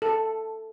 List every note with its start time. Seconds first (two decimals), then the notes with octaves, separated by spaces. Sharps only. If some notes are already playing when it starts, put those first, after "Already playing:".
0.02 A4